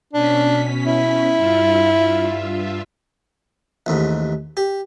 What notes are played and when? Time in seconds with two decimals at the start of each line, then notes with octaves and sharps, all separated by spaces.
0.13 B2 C#4 D4 B6
0.86 E4
1.35 G2 F4 E5
3.86 A1 D#2 G#2
4.57 G4